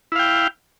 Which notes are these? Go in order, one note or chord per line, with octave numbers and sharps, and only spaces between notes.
E4 F5 G5